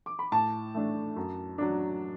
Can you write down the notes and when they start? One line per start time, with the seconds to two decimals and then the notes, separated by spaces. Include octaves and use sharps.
0.06 D6
0.19 B5
0.32 A2 A5
0.74 A3 D4
1.16 F#2
1.58 F#3 D4